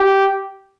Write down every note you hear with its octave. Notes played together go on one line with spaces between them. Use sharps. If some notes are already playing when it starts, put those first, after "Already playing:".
Already playing: G4